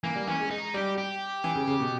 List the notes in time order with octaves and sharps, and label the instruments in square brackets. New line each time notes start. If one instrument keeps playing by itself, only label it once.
[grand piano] E3 [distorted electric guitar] A#3
[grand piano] G3
[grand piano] E3 [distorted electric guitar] C#4
[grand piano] G#3
[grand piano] G#3 [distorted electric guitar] D#4
[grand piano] G3 [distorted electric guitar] G4
[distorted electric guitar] G4
[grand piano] E3
C#3
C#3
B2